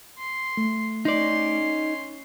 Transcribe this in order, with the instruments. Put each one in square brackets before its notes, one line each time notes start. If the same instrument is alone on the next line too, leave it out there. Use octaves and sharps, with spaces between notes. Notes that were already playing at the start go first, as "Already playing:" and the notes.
[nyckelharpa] C6
[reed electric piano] A3
[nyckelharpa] C#4 C6 [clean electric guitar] D#4 D5